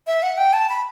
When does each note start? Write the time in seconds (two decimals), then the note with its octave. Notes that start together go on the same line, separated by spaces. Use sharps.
0.07 E5
0.23 F#5
0.38 G5
0.53 A5
0.69 B5